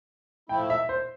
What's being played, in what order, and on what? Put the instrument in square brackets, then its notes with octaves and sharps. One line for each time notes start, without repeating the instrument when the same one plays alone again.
[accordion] A2 F3 A3 E4 [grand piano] G5
[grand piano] E5
C5